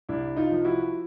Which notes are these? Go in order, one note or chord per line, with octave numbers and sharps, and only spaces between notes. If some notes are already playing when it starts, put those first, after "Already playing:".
C2 D4 E4
D#4 F4
F3
E4 F#4